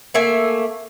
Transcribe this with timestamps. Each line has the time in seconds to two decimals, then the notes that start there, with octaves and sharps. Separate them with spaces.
0.14 A3 A#3 E5 G#5